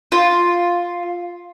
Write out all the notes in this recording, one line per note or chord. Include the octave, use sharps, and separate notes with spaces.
F4